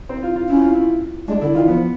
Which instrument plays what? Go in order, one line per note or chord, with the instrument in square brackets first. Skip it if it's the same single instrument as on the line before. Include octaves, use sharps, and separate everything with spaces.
[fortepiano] C4
F4
F4
[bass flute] C#4 [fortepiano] E4
[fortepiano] F4
E4
[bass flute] G#3 [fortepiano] D4
[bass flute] D3 [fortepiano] E4
[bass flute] D#3 [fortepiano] F4
[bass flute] F3 [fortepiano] B3